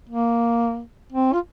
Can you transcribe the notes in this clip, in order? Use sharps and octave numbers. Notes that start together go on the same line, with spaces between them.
A#3
C4
F4